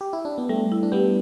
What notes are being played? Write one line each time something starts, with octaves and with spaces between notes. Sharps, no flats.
G4
E4
D4
B3
G3 A3
E4
D4
G3 B3 G4